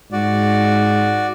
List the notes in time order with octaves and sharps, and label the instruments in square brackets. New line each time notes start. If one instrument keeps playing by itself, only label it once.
[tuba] G#2 [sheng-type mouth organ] F#4 D5